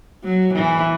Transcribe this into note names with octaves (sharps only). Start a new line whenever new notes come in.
F#3
E3